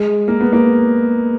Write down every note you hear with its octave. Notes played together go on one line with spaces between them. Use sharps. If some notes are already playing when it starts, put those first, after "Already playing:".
Already playing: G#3
A#3
B3
A#3